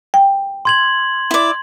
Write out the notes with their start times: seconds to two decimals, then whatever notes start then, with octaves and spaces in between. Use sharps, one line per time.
0.14 G5
0.65 C6 G#6 F#7
1.31 E4 D5